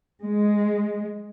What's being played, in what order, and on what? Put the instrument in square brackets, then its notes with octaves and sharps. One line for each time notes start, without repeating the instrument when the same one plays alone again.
[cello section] G#3